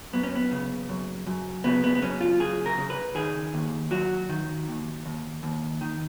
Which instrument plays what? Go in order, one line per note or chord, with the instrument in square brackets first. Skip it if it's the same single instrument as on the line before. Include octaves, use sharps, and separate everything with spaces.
[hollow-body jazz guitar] F#2 B3
C#4
B3
C#3
F#2
F#2
C#3 B3
B3
B3
F#2 C#4
F4
C#3 G#4
A#4
C#3
B4
D#3 G#4
D#2
F#3 F#4
D#3
D#2
D#2
D#2
D#3